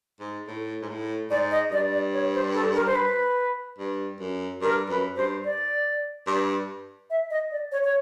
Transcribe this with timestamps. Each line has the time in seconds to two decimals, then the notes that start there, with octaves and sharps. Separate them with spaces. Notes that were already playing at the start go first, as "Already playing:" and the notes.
0.20 G#2
0.47 A2
0.82 G#2
0.89 A2
1.30 G#2 D5
1.51 D#5
1.71 G2 D5
1.92 D5
2.13 C#5
2.34 C5
2.54 A4
2.75 A#4
2.86 C5
2.95 B4
3.79 G2
4.20 F#2
4.61 G2 A#4
4.89 F#2 B4
5.16 G2 C5
5.44 D5
6.27 G2
7.10 E5
7.30 D#5
7.51 D5
7.72 C#5
7.84 C#5